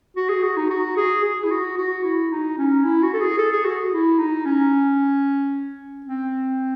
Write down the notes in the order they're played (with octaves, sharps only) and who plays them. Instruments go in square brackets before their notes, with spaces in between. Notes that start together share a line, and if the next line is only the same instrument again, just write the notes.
[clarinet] F#4
G#4
F#4
D#4
F#4
G#4
G#4
E4
F#4
F#4
E4
D#4
C#4
E4
F#4
A4
G#4
A4
G#4
F#4
E4
D#4
C#4
C4